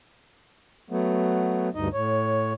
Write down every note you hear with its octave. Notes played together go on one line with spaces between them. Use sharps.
F#3 A3 B3
D2 G2 D#4 D#5
A2 C#5